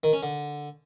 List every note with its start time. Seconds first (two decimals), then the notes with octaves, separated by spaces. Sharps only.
0.04 D#3
0.13 C#4
0.23 D3